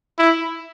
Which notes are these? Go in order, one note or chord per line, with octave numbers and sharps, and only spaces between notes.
E4